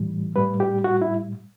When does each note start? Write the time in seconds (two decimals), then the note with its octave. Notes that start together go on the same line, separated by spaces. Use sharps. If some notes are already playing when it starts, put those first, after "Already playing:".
Already playing: A2 E3 G3
0.36 A2 G3 B4
0.60 G4
0.84 F#4
1.02 E4